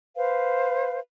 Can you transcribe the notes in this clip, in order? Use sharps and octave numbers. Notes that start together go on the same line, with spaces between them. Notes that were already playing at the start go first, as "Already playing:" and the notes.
B4 C5 F5